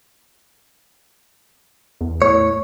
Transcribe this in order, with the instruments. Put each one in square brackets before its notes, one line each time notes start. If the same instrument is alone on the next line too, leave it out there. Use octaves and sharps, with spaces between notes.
[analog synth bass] E2
[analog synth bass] A2 [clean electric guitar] C#5